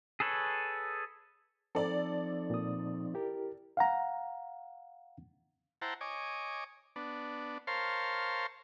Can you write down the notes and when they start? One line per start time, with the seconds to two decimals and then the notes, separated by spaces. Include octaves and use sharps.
0.20 G#4 A4 B4 C#5
1.75 F3 C4 D#4 A4 D5
2.50 A#2 D#6
3.14 E4 G4 A#4
3.77 F5 F#5 A#5
5.82 E4 C5 F#5 G5 A5 A#5
6.01 C#5 D#5 G#5 D6
6.96 B3 D4
7.67 A#4 C5 C#5 F5 A5 C6